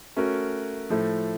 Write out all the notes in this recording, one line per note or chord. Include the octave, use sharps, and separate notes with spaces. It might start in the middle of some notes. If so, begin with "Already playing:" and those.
A3 C#4 F#4 A#4
A2 F3 A3